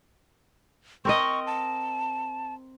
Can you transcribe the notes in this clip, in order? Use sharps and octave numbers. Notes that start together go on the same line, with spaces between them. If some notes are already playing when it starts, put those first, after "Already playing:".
C4 A#4 D#5 C#6
A5